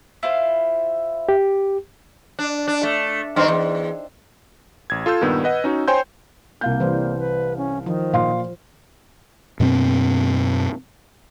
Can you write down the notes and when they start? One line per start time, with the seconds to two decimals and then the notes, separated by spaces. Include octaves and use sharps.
0.23 E4 F4 C5
1.29 G4
2.39 D4
2.68 D4
2.83 A3
3.36 G2 D#3 C4
3.48 E2
4.90 A1 G#6
5.06 F4 A4 C6 E6 G6
5.21 G2 A#2 D#3 B3
5.44 B4 D#5 F#5
5.64 C#4 D#4 F#4
5.88 C5 C#5 G5 G#5 C6 G6
6.61 C2 A#3 F5 G6
6.80 E3 G3 C5
7.19 B4
7.57 C#4
7.86 D#3 F3
8.13 A#2 F5 C6
9.60 F#2 B2 B3 C4